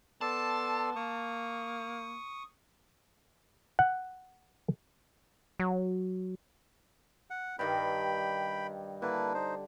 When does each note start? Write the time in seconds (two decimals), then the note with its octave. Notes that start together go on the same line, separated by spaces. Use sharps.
0.21 B3 A4 D5 A5 C6
0.96 A#3 C#6 D#6
3.79 F#5
5.60 F#3
7.30 F#5
7.59 G2 D#3 G3 G5 B5
9.02 D3 A#3 E4 B4
9.34 D#4 C5